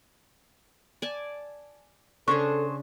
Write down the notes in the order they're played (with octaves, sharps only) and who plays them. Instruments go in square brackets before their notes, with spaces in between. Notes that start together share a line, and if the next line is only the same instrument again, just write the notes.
[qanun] D5 G#5 A5
[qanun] C#3 D4 [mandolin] G#4 C5 C#6 [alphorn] A4